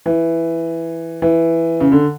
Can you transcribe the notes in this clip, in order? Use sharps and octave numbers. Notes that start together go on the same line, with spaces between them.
E3
E3
C#3
D3